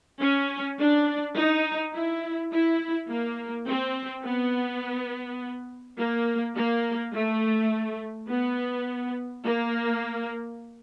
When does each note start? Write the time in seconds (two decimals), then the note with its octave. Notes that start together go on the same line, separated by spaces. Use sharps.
0.20 C#4
0.78 D4
1.36 D#4
1.94 E4
2.51 E4
3.09 A#3
3.67 C4
4.25 B3
5.98 A#3
6.56 A#3
7.14 A3
8.29 B3
9.44 A#3